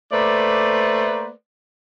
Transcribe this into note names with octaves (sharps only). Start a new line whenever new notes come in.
A3 A#3 B4 C5 D5